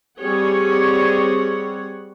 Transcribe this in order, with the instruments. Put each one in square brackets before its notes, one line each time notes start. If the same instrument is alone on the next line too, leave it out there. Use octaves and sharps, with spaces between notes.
[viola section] G3 C4 G#4 C#5 F#5